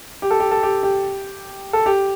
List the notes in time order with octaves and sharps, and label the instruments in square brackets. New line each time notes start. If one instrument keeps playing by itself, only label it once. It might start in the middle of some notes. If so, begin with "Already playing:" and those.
[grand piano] G4
A4
G4
A4
G4
G4
A4
G4